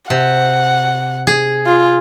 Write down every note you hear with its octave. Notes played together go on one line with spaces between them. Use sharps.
C3 F#5
G#4
F4